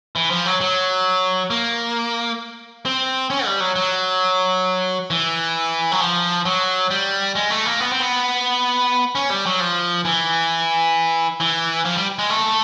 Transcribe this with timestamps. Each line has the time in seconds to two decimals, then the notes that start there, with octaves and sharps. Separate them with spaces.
0.16 E3
0.30 F3
0.46 F#3
0.61 F#3
1.50 A#3
2.86 C4
3.30 C#4
3.46 G3
3.60 F#3
3.76 F#3
5.10 E3
5.92 F#3
6.00 F3
6.45 F#3
6.91 G3
7.35 G#3
7.50 A3
7.66 A#3
7.80 B3
7.91 C4
8.00 B3
9.15 C#4
9.30 G3
9.46 F#3
9.60 F3
10.05 E3
11.40 E3
11.85 F3
11.96 G3
12.19 G#3
12.30 A3